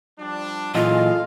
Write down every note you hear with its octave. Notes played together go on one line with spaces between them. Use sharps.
F3 G3 D4
A#2 E3 F#3 F4 G#4 A4 D#5 F5